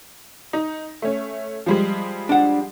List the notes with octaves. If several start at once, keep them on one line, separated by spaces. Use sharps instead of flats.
D#4
A3 C#4
F3 G3 G#3
D4 F#5